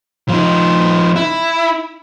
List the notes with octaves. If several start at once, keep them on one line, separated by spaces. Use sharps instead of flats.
F3 D#4
E4